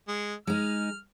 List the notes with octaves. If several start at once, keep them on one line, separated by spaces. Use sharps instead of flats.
G#3
G#3 D#4 F6